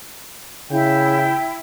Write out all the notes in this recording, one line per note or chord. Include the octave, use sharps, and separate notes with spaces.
C#3 E4 G5